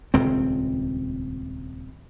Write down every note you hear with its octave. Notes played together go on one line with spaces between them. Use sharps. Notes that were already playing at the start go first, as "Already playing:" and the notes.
D#1 C#2 C4